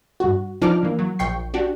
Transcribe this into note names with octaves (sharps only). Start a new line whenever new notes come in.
G2 F#4
F3 D4 D#4 D6 F6
E3 A#3
F#3
A#1 G5 C#6 C7
D4 F#4 G4